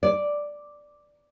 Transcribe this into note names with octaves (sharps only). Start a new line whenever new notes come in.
D5